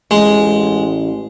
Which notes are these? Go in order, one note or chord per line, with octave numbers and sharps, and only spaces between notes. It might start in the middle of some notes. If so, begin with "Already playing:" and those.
A1 G#3